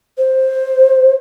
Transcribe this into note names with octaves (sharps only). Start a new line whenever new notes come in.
C5